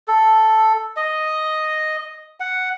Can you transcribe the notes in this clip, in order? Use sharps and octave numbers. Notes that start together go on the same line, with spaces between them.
A4
D#5
F#5